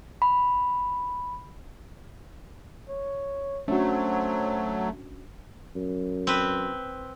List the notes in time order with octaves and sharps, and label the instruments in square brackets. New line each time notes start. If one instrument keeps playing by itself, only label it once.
[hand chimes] B5
[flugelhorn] C#5
[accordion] F#3 [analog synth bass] A3 [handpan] C#4 D4 F#4 [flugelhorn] C5
[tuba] F#2
[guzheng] C4 B4